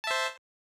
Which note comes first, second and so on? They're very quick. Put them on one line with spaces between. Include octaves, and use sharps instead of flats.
A5 E5 C5